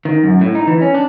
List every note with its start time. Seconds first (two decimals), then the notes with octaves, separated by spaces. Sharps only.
0.05 D#3
0.24 F#2
0.41 A2
0.55 D#4
0.67 E3
0.81 C#4
0.94 D4